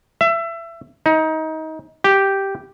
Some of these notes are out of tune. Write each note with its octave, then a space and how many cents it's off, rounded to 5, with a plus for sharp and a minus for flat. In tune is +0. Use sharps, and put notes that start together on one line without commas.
E5 +25
D#4 +25
G4 -5